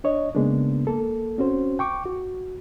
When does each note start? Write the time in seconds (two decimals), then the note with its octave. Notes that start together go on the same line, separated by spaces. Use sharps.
0.04 D4 C#5 D#5
0.35 C#3 G#3 A#3 B3 D4
0.87 A#3 A4
1.38 C4 C#4 F#4 C5
1.79 G5 C#6 D6
2.06 F#4